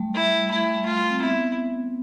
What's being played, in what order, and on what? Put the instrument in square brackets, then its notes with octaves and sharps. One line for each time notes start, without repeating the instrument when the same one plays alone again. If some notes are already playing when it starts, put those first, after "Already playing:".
Already playing: [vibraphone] G3 A3
[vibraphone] G3 [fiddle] E4
[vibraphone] A3 [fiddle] E4
[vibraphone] G3
A3
[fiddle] F4
[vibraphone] C4
[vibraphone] B3 [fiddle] E4